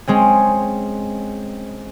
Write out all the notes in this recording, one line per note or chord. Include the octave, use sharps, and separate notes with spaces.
G#3 C4 C#4